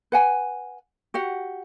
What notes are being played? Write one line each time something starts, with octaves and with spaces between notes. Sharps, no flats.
B4 F#5 G#5
F#4 G4 F#5